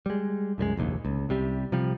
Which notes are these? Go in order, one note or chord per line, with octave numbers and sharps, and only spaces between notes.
G3 G#3
C2 F#2 G3 G#3
F1 A#1 D#2
C#2
C2 C3 G3
C3 F3 G3